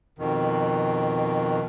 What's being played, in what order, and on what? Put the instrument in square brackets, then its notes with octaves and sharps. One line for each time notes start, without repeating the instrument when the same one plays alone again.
[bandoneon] F2 B2 D#3